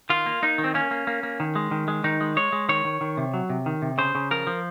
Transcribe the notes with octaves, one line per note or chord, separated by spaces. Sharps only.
D#3 F4
A#3
A#3 D#4
D#3
C4
A#3 C#4
A#3
A#3
A#3
D#3
G#3
D#3
G#3
D#3 D#4
G#3
G#3 C#5
G#3
D#3 C#5
D#3
D#3
C3
F#3
C3
D#3
C3
C#3 C5
C#3
F3 A#4
F3